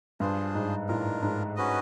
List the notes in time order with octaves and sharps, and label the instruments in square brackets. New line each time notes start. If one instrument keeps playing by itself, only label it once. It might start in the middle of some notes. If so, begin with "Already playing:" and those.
[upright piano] G2 [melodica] D4 F4 G#4 C5
[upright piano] G#2
[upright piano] A2 [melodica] D4 F4 A#4
[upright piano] G#2
[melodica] C#4 F#4 B4 D#5